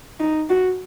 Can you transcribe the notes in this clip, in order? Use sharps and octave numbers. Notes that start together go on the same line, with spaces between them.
D#4
F#4